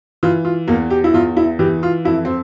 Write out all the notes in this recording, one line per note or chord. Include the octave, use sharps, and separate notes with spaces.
E3 F4
F4
E2 A#3
G4
E4
E2 F4
E4
E3 G4
F4
F2 E4
C4